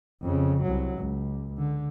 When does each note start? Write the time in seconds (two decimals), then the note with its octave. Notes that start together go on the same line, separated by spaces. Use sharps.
0.22 F2 C#3
0.62 C2 F#3
0.99 C#2
1.58 D3